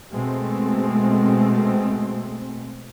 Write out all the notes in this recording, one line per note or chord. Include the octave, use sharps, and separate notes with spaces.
B2 G#3 A3 C4